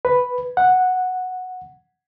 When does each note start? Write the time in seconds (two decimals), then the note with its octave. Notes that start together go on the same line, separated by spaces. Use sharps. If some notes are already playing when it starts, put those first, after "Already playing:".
0.05 B4
0.57 F#5